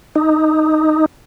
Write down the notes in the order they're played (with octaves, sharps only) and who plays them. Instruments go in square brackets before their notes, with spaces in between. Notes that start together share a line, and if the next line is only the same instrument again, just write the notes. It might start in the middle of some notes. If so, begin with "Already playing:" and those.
[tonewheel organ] D#4